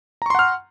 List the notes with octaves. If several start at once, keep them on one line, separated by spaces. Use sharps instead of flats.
F#5 A#5 C6 C#6 F6